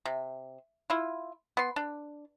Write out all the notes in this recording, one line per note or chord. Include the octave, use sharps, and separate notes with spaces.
C3
E4 F4
B3 C6
D4